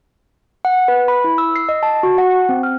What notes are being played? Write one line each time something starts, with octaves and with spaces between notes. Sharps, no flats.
F#5
B4
B5
E4
E6
C7
D#5
A5
F#4
F#5
C4
F6